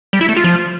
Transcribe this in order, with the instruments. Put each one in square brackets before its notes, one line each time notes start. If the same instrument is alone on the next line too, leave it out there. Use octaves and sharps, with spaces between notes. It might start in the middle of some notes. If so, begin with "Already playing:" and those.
[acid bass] G3
E4
A3
F4
F3